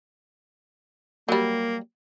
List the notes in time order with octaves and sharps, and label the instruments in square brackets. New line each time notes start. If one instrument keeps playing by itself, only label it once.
[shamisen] F#3 G3 [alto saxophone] A#3